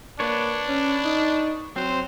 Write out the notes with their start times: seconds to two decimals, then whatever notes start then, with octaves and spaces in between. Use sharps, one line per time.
0.20 A#3 D4 B4 C#5
0.68 C#4
1.04 D#4
1.76 F#3 C4 C5